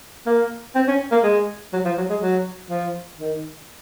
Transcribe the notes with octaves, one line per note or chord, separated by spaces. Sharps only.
A#3
C4
C#4
A#3
G#3
F#3
F3
F#3
G#3
F#3
F3
D#3